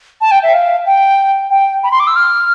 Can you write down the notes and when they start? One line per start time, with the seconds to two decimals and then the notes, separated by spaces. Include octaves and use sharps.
0.21 A5
0.31 G5
0.43 E5
0.53 F5
0.86 G5
1.50 G5
1.83 B5
1.91 C6
2.00 D6
2.07 E6
2.16 F6